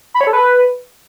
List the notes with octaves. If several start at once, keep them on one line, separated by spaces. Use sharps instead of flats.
B5
C#5
A4
B4